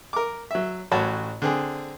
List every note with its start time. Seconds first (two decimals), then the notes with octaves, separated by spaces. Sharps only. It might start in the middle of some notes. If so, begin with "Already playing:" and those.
0.13 A#4 D6
0.51 F#3 E5
0.92 A1 F#4 C#5 A5 B5
1.42 D3 C4 G#4